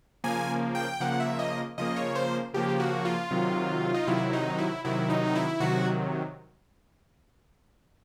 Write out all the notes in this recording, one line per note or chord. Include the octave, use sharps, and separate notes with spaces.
C#3 F3 A#3 G#5
G5
C#3 F3 A#3 F#5
E5
D#5
C#3 F3 A#3 D#5
C#5
C5
C#3 F3 A#3 G4
F#4
F4
C3 D#3 F#3
D#4
C3 D#3 F#3 E4
D#4
E4
C3 D#3 F#3 E4
D#4
E4
C3 D#3 F#3 F#4